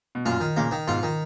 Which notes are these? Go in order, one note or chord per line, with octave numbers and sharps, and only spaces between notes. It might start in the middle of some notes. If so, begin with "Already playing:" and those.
B2
F#2 A#2 F4
D#3
A#2 C#3 A#3
D#3
G#2 B2 F4
D#3